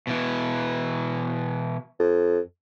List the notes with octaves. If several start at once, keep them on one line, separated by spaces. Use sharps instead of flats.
B2 E3
F2